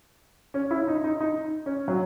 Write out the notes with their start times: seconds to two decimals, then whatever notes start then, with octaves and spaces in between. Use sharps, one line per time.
0.54 C#4
0.71 E4
0.88 D#4
1.04 D#4
1.21 D#4
1.66 C#4
1.88 F#3